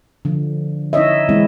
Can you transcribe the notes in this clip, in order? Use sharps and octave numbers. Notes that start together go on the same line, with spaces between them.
D3 F3
D#4 E4 C#5 D#5 E5
E3 G#3 C4 D#4 E4